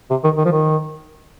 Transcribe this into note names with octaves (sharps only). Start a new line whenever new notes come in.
C3
D#3
D#3
F3
D#3